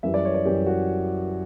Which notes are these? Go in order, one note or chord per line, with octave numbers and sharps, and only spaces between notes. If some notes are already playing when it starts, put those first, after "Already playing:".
F#2 E3 G3 E5
D5
C#5
D5
F#2 E3 G3 G4
F#4